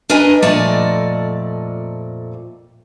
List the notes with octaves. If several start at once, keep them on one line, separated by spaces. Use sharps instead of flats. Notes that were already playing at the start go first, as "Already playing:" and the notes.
D4 A#4 B4 D#5 G#5
F2 A#2 A3 D5 D#5 A5